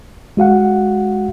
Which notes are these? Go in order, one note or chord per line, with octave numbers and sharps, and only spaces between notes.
G#3 F#4 F5 F#5